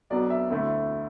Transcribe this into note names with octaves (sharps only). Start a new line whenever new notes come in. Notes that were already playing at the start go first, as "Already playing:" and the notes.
B1 B2 F#3 B3 D4 D5
E5
D2 D3 A3 E4